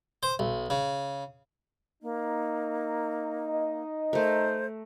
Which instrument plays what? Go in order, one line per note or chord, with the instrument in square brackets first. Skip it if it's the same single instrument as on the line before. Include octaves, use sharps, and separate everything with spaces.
[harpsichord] C5
B1
C#3
[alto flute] A#3 [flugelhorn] D#4
[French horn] D#5
[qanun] A3 A#4 [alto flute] C5